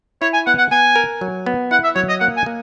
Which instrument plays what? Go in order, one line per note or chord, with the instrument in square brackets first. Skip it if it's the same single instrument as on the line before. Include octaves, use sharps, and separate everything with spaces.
[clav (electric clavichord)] E4 [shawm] C#5
[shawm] G#5
[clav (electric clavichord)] B3 [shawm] F#5
[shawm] F#5
[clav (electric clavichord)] B3 [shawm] G#5
[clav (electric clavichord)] A#4
F#3
B3
[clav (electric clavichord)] E4 [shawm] F#5
[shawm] E5
[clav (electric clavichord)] F#3 [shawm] C#5
[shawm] D#5
[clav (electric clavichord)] A#3 [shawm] F#5
[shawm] G#5
[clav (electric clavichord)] A#3